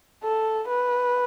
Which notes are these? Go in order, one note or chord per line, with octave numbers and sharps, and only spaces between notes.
A4
B4